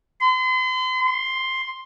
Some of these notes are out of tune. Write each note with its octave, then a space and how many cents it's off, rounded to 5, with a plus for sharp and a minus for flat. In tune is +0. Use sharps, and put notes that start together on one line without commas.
C6 -40
C6 +5